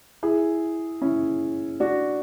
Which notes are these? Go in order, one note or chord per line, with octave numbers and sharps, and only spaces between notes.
E4 G#4
C#4 E4
D4 F#4